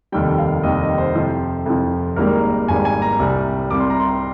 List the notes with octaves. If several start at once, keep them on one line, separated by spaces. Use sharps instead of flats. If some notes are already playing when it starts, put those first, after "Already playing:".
F1 D#2 D#3 G3 G5
F5
F1 D#2 D#3 G3 D#5
D#5
C5
F2 C3 F3
F2 C3 F3
G#1 G#2 G3 A#3 A#4
G#1 G#2 G3 A#3 G#5
G#5
A#5
C2 C3 G3
C2 C3 G3 D6
C6
A#5
C6